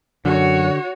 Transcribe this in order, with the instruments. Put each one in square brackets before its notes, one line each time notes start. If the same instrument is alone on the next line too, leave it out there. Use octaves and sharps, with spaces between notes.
[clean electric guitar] F#2 [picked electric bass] D3 [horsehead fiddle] F#4 C#5